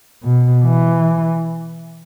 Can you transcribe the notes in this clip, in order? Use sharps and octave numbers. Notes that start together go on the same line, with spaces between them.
B2
E3